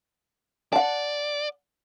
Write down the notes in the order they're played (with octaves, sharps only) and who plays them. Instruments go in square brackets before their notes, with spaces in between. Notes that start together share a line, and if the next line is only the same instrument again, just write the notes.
[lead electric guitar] D5 [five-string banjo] F#5 A5